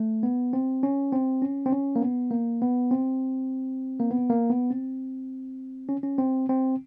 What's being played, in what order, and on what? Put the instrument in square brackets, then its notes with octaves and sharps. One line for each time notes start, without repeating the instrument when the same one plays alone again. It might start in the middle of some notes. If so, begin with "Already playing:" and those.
Already playing: [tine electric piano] A3
B3
C4
C#4
C4
C#4
C4
C#4
A#3
B3
A#3
B3
C4
A#3
B3
A#3
B3
C4
C#4
C#4
C4
C4